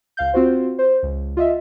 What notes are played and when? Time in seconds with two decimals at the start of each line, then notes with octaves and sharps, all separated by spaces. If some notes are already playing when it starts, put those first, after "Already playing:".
0.17 C#2 F5 G6
0.33 C4 F4 F#4 C5
0.78 C5
1.03 C#2
1.37 F4 D#5 E5